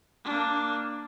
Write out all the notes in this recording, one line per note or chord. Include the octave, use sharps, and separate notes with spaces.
A#3 D4